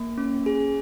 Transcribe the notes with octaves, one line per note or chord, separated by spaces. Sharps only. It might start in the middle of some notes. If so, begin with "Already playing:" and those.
Already playing: A#3
C#4
G#4